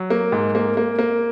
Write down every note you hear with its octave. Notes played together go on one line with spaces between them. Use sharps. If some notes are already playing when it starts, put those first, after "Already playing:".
Already playing: F#3
A#3
G#2
A#3
A#3
A#3